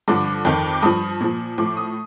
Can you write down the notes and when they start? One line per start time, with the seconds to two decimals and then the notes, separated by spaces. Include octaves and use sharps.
0.08 G2 D3 F3 D6
0.45 F2 D#3
0.73 D6
0.82 G2 F3 D#6
1.21 A#2 F3
1.58 A2 F3 D6
1.77 D#6